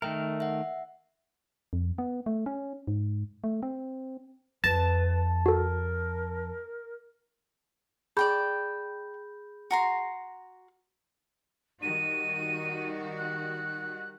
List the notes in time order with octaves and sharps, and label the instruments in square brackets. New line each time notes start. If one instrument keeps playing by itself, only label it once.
[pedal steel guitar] D#3 A3 A#4 [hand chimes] E5 G5
[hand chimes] E5 F#5
[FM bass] F2
B3
A3
C#4
G#2
A3
C4
[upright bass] F2 [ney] B4 [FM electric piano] A5 [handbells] A#6
[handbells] F#4 A4 [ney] A#4
[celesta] G#4 B5 G6 [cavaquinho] D5 G5 A5
[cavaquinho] F#4 A#5 C6
[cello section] D#3 G3 F#4 [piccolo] D#7
[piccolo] F#6